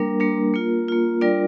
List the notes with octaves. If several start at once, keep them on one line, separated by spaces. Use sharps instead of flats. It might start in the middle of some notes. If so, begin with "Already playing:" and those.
Already playing: G3 A#3 D4 A#4
G3 A#3 D4
A#3 F4
A#3 F4
G3 D4 F4 A#4 D5